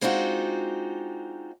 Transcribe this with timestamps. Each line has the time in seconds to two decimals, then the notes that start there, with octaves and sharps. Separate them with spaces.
0.01 G#3 C4 D4 D#4 F4 F#4